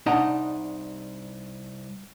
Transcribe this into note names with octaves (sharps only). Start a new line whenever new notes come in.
C2 D4 D#4 D#5 F#5 A#5